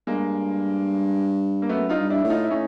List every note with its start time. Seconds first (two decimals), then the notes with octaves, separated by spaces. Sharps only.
0.07 G2 G#3 A#3
1.62 A#3
1.69 F#2 A3 B3
1.89 D#4 F4
1.97 G2
2.10 D4 E4
2.24 A2
2.30 D#4 F4
2.44 E4
2.50 A2 C#4 D#4